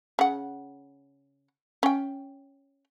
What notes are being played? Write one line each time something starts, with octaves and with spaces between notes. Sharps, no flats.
C#3 F#5
C#4 G5